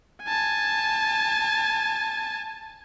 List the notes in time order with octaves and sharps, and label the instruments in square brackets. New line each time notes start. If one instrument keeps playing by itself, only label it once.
[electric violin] G#5 A5